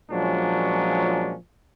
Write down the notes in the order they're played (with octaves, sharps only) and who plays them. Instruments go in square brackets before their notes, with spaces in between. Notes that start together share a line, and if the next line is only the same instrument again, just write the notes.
[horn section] A#2 F3 F#3 G#3 C#4 D4